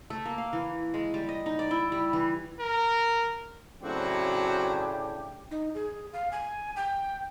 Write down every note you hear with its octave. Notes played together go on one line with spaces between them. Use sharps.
A3
A#3
F5
E3
G#3
G3
D#5
D#4
D5
E4
G3
E3
A#4
A2 C#3 F#3 C4 D4 F#4 G4
D#4
G#4
F5
G#5
G5